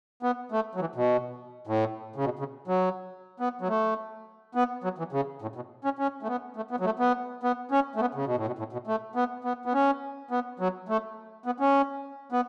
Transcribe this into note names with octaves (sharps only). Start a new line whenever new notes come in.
B3
A3
F#3
E3
B2
A2
C#3
B2
C#3
F#3
B3
F#3
A3
B3
F#3
E3
C#3
A2
B2
C#4
C#4
A3
B3
A3
B3
F#3
A3
B3
B3
C#4
A3
B3
C#3
B2
A2
B2
A2
B2
A3
B3
B3
B3
C#4
B3
F#3
A3
B3
C#4
B3